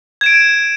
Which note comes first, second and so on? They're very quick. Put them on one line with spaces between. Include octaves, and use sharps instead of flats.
G#6 E7 D7